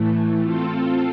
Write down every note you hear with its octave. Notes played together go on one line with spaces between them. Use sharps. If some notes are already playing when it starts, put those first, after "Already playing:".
Already playing: A2 E3 A3
C4 F4 A4